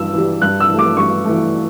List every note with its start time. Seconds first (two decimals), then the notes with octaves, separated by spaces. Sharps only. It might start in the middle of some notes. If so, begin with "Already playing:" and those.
Already playing: G2 E3 E6
0.13 E3 G3
0.41 G2 F#6
0.60 E6
0.69 E3
0.74 A3 D6
0.97 G2 C#6
1.25 E3 A3